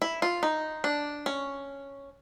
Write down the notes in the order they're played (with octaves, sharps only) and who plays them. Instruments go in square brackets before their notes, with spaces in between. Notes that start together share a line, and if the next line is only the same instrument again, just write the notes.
[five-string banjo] E4
F4
D#4
D4
C#4